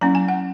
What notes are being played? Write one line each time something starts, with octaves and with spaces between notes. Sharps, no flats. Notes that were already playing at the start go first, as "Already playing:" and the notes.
F#3 A#3 C#4 E4 A#5
G#5
F#5